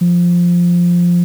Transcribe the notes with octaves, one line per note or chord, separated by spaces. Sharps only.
F3